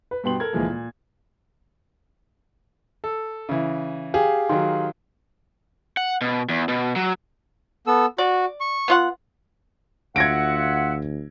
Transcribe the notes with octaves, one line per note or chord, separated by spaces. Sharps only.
B4
G2 B2 B3 G5 C6 F#7
A4 A#4 G#6
D2 A#2 E3 F3 G#3 A#3
A#2
A4
C#3 E3
G4 G#4 F5
D#3 F#3 F5 C6
F#5
B2
E2
B2
F#3
B3 A4 E6
F#4 D5
C#6
B3 F4 F#5
D2 F4 E5 F#5 G#6 A#6 D7